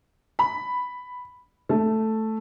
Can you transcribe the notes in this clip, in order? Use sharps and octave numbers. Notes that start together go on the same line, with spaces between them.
B5
A3